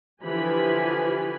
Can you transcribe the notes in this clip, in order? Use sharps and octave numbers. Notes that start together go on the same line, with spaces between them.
D3 E3 F3 G4 G#5 B5